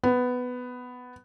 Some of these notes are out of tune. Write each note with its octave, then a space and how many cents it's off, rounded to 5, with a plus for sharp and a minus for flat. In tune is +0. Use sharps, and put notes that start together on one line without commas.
B3 +10